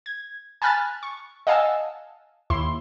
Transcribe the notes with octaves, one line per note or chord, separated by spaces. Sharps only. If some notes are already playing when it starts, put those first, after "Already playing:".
G#6
G#5 A5 B5 F6 F#6 A6
C#6
D#5 F5 F#5 G#5 A5 E6
D#2 E4 C6